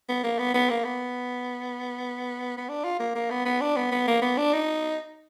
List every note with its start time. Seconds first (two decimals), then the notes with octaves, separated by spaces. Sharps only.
0.09 B3
0.24 A#3
0.39 B3
0.54 B3
0.70 A#3
0.84 B3
2.57 B3
2.69 D4
2.84 F4
2.99 A#3
3.15 A#3
3.30 B3
3.45 B3
3.61 D4
3.76 B3
3.92 B3
4.07 A#3
4.22 B3
4.37 D4
4.53 D#4